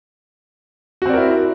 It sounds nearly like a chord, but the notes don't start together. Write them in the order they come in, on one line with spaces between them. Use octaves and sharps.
F#4 C4 D5 A#4 E4